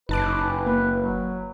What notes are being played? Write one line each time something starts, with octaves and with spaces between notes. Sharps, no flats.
F#1 D#4 B4 A5 D6
A#3 B4
F#3